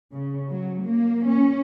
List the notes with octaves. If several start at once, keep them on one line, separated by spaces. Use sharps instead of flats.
C#3
F#3
A#3
C#4